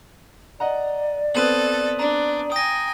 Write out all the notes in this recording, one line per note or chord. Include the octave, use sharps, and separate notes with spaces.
D5 D#5 F#5 A#5
B3 C4 A4 B4 D#6 D#7 F#7
D4 A#5
G5 G#5 D#6 A#6